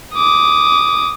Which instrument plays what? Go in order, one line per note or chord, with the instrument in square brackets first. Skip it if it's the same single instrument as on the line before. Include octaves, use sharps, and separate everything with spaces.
[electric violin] D6 D#6